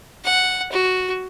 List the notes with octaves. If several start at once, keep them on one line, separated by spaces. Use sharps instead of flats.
F#5
F#4